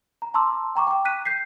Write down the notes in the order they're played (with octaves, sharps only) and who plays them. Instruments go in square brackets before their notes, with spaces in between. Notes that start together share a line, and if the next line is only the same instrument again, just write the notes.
[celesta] A#5
A5 A#5 C6 D6 E6
G5 A#5 C#6 D6
G5 D6
F#6 B6 D#7
G6 B6 C7